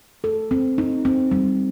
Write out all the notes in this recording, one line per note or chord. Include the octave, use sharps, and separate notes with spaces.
A4
C4
D#4
C4
G3